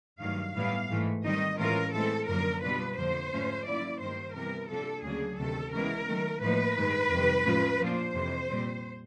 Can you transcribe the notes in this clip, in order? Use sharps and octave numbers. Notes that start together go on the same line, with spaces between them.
G2 D#3 F#3 A3 F5
A2 E3 G3 B3 E4 F5
G#2 E3 A3
D#3 G3 C4 D#4 D#5
A2 E3 G#3 C#4 F4 A#4
A2 E3 G#3 C4 A4
F#2 D3 F3 A#3 A#4
B2 G3 B3 D4 F4 B4
F2 D3 F3 A#3 C5
G#2 F3 A3 C#4
D#3 F#3 A#3 C#4 E4 D5
G2 D#3 G3 A#3 C5
C3 E3 G3 B3 A#4
C3 F3 A#3 D4 A4
D2 C#3 F#3 A#3 D4 G#4
D2 C3 D#3 A4
C#3 E3 G#3 B3 E4 A#4
D#3 F#3 A3
A2 F3 A#3 D#4 B4
G2 D#3 G#3
F2 C3 D#3 G3
A2 F3 G#3 C#4 F4
A#2 F3 A#3 D4 F4 C5
F2 C3 E3
A#2 G3 C4